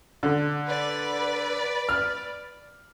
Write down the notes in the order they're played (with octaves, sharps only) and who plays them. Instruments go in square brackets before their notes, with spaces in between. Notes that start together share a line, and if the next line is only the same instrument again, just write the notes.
[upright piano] D3
[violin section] B4 D5
[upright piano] F6